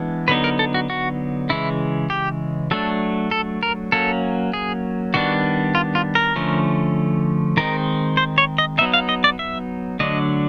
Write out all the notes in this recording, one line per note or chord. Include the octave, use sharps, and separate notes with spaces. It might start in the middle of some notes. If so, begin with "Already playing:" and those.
Already playing: E3 G#3 B3 D4
D3 F#3 B3 D#4 B4
A#4
A4
F#4
F#4
C#3 E3 G#3 E4
G4
F#3 A3 D4 A4
A4
A#4
F#3 A#3 C#4 A4
G#4
D#3 G3 B3 D4 F#4
F4
F4
A#4
D3 F3 A3 C#4
D#3 G#3 C4 D#4 A#4
C5
C#5
D#5
F#3 B3 D#4 E5
F5
D#5
D5
E5
D3 F#3 A3 D4 D#5